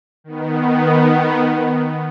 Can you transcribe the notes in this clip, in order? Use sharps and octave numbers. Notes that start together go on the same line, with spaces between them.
D#3 B3